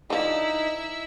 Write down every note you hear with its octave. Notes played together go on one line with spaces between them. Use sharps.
D3 F3 D#4 E4 E6